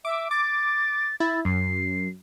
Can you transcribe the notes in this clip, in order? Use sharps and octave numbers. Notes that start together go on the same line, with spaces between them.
E5 D6
D6 A6
E4 A6
F#2 C7